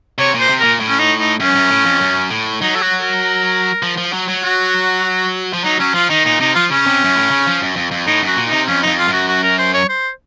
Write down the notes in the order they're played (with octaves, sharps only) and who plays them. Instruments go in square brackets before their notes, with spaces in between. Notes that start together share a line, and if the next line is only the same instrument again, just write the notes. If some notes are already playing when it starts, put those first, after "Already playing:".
[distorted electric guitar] C3 [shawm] C#5
[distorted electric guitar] A#2 [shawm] C5
[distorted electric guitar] C3
[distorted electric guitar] A#2 [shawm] A#4
[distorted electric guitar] A2
[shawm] C#4
D#4
D#4
[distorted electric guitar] F#2 [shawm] C#4
[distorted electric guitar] F#2
A2
F2
F#2
A2
[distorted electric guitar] F#3 [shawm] D#4
[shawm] A4
F#4
A#4
[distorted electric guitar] F3
F3
F#3
F#3
[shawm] F#4
[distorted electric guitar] F3
[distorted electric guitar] F#3 [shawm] D#4
[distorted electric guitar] F#3 [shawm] C#4
[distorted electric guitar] F3 [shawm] F4
[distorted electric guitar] D#3 [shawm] D#4
[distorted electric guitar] A#2 [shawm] D#4
[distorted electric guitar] C3 [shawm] D#4
[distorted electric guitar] F3 [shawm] F4
[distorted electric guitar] C#3 [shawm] C#4
[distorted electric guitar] C3
F#2
A2
C#3
F3
F#2
F2
F2
[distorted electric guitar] A2 [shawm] D#4
[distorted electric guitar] F#2 [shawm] F#4
[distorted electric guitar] A#2
[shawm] D#4
[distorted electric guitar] C3
[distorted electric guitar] F2 [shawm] C#4
[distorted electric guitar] F2 [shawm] D#4
[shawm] F4
[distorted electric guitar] F#2 [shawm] F#4
[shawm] F#4
A#4
C5
C#5
C5